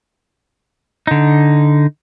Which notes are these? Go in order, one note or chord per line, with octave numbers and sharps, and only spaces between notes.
D3 D#4